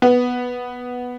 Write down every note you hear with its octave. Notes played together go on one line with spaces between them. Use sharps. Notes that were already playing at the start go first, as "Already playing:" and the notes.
B3